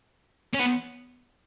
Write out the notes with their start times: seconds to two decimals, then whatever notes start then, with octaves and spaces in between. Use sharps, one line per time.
0.53 C#4
0.59 B3